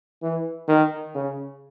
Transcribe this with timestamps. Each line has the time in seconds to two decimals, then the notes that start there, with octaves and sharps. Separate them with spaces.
0.22 E3
0.69 D#3
1.15 C#3